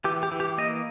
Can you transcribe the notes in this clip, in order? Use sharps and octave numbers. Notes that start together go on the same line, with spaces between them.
E3 G4
G4
E3
G4
A#3 D#5